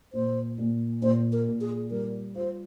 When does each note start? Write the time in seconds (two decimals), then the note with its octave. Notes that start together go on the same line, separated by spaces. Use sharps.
0.13 A#2 C5
0.58 A#2
1.02 A#2 C5
1.32 A#4
1.47 A#2
1.61 G#4
1.91 G3 A#4
2.35 F4 C5